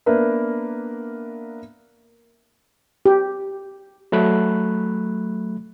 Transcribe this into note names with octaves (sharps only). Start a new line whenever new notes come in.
A#3 B3 D4 A#4 B4 E5
G4
F#3 A3 B5 F#6